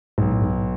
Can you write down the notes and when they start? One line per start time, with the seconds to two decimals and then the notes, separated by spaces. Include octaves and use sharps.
0.18 B1 G#2
0.30 A2
0.43 G#2